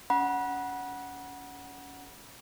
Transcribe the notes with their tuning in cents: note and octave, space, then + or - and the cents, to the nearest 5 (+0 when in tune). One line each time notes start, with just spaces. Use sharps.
C#4 +25 F#5 +0 B5 -35